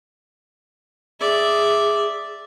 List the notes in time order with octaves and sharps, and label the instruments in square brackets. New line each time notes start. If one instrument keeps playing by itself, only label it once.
[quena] G#4 [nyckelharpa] D5 E5